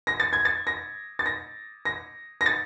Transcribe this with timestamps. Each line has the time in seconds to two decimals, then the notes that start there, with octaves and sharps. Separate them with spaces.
0.07 A#6
0.20 A6
0.33 G#6
0.45 A6
0.67 A#6
1.19 A6
1.26 A#6
1.85 A#6
2.41 A#6
2.46 A6